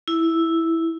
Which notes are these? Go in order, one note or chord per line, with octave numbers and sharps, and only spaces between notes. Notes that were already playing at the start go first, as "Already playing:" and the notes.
E4